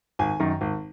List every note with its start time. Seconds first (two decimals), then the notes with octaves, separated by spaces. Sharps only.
0.19 G#1 G#5
0.40 F#2 D#3
0.61 G#1